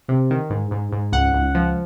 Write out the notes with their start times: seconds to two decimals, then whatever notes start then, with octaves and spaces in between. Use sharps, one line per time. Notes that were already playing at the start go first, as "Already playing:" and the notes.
0.08 C3
0.30 D#3
0.50 G#2
0.71 G#2
0.92 G#2
1.12 C#2 F#5
1.34 C#2
1.55 F3